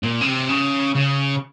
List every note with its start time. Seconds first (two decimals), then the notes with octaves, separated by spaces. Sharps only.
0.03 A#2
0.21 C#3
0.26 C3
0.49 C#3
0.94 C#3